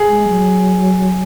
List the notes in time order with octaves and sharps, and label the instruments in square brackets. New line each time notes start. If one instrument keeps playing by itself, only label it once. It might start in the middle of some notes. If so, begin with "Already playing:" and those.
Already playing: [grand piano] G#4
[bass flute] G#3
F#3